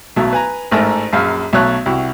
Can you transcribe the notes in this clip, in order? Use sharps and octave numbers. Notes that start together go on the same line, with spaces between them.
B1 F#3 A3
B4 G#5 A#5
A1 G#2 A3 A#4 A#5
A#1 F#2 F5
B1 F#3 A3 C#5 F#6
C2 E4 F#4